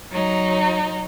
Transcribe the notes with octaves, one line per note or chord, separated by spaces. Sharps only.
F#3 D#4